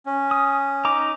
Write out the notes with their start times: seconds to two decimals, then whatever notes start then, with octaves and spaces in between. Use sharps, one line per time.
0.06 C#4
0.31 D#6
0.85 D#4 A#5 D6